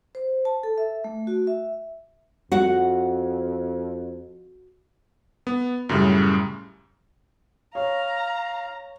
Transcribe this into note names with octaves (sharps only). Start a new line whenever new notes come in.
C5
A5
A4
E5
A3
F#4
E5
F2 F#4 F#5
B3
F#2 A2 C#3 G3
C#5 F5 A#5